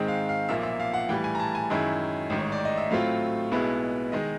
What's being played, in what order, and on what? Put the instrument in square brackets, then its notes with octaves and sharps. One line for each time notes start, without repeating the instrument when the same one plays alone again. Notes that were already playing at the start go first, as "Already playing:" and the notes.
Already playing: [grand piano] G#2 D#3 G#3 C4
F5
F5
B1 A#2 F3 A#3 E5
E5
F5
F#5
A2 E3 G3 G5
G#5
A#5
A5
G#5
F#2 D#3 G#3 C#4 E4
A1 G#2 D#3
C#5
D5
D#5
E5
A2 F#3 A3 C4 F4 F5
B1 B2 G#3 B3 E4
D#3 G#3 D#5